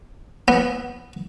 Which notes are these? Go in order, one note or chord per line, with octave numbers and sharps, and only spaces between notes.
B3